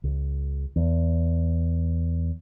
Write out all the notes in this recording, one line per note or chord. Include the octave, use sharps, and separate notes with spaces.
C#2
E2